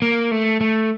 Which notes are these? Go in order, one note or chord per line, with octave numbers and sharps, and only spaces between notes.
A#3
A3
A3